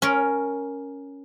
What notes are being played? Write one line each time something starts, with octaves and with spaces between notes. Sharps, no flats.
C#4 A#4